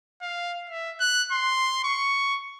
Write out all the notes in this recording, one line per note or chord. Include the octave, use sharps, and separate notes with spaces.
F5
E5
F#6
C6
C#6